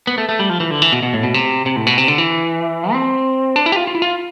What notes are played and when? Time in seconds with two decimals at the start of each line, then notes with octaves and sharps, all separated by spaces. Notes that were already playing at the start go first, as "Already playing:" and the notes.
0.07 B3
0.18 A3
0.29 A3
0.40 G3
0.50 F3
0.60 E3
0.71 D3
0.82 E3
0.92 B2
1.03 B2
1.14 A2
1.23 B2
1.34 C3
1.66 C3
1.76 A2
1.87 B2
1.98 C3
2.08 D3
2.18 E3
2.92 C4
3.56 D4
3.66 E4
3.72 G4
3.76 F4
3.87 F4
3.95 E4
4.02 F4